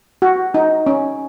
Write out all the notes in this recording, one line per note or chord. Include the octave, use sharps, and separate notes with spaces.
F#4
D#4
C#4